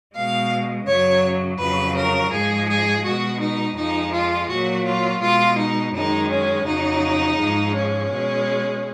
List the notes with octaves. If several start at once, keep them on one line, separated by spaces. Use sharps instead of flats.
B2 G#3 F5
F#2 C#3 F#3 C#5
F2 C#3 F#3 B4
A#4
G#2 F3 G#3 G#4
G#4
B2 G#3 F#4
D#4
F2 F3 G#3 D#4
F4
A#2 F#3 F#4
F4
B2 G#3 F4
D#4
F#2 D#3 G#3 D#4
C#4
F2 C#3 F#3 D#4
G#2 F3 G#3
C#4
B2 G#3